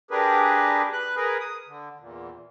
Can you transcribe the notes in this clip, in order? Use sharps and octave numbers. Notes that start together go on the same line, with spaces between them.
D4 G4 G#4 A#4 B4
B4 F#6
G#4 A#4 B4
D#6
D3
E2 A#2